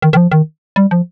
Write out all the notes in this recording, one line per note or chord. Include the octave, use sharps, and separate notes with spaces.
D#3
D#3
F3
D#3
G3
F3